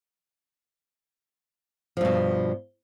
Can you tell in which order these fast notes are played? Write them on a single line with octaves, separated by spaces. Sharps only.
F3 G2 B2